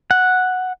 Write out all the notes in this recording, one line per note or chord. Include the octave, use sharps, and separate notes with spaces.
F#5